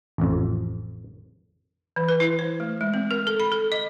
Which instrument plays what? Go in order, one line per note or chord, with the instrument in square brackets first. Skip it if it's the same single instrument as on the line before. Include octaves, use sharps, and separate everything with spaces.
[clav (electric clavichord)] A1 F2
[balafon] E3
B4
E4
C5
A3
G#3
C4
A#4
A4
B5
A4
D#5